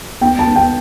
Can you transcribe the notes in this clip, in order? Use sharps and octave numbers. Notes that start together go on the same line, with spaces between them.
B3 G5
A5
B3
G5